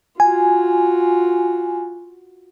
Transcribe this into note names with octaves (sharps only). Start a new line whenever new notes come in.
F4 F#4 G#5